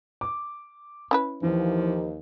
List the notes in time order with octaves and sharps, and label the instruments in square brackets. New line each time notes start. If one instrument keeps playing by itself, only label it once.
[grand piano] D6
[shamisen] C#4 E4 B4
[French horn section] D#2 [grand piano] E3 [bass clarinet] F3